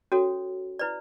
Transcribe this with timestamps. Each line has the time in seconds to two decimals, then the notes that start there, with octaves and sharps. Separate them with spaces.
0.12 C#4 F#4 A4 C#5
0.79 E4 B4 D5